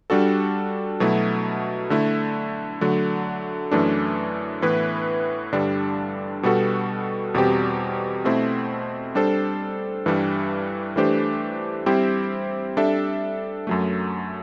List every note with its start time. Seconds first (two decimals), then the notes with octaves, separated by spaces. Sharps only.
0.10 G3 D4 F#4 A4
1.00 B2 F#3 A3 E4
1.90 D3 A3 E4
2.81 D3 F#3 A3
3.71 F#2 E3 A3 D4
4.62 A2 E3 B3 E4 B4
5.52 G2 D3 G3 D4
6.43 B2 G3 B3 F#4 A4
7.34 E2 B2 G3 C4 G4
8.24 B2 A3 C4 E4
9.15 G3 D4 A4 C5
10.06 G2 E3 G3 D4
10.96 E3 A3 D4 G4 C5
11.86 G3 C4 E4 G4 C5
12.77 G3 D4 A4 E5
13.67 F#2 F#3 A3